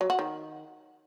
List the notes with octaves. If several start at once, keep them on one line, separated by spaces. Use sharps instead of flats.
F#3
F#4
D#3